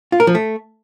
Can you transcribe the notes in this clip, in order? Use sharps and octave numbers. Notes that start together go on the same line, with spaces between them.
F4
A#4
F3
A3